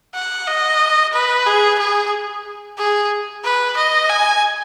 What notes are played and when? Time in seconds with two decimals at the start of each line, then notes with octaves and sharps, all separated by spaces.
0.15 F#5
0.47 D#5
1.13 B4
1.46 G#4
1.79 G#4
2.78 G#4
3.44 B4
3.77 D#5
4.09 G#5